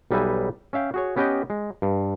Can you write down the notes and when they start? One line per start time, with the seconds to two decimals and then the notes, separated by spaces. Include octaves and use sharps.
0.11 B1 G3 D#4 B4 E5 G#5
0.73 C#4 E5 F5 G5
0.94 F#4 G#4 C#5
1.16 B3 C#4 G4 B4 D#5 G5
1.50 G#3
1.82 G2